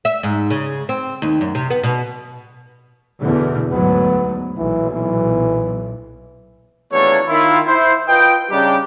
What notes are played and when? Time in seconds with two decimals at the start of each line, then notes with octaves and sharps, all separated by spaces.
0.05 E5
0.23 G#2
0.50 C#3
0.89 C4
1.22 D#2
1.41 F#2
1.55 C3
1.70 B3
1.84 B2
3.20 E2 B2 D3
3.70 D2 G#2 F#3 B3
4.57 B1 A#2 E3
4.91 E3
6.92 G#1 E2 A3 A#3 D4 C#5
7.28 D#3 E4 F4
7.65 E4 C5
8.07 F4 B4 D#5 G5
8.49 C#3 G3 D4 D#4 G4